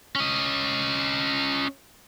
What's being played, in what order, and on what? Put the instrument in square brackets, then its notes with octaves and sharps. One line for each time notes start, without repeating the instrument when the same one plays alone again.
[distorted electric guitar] C#4 D#5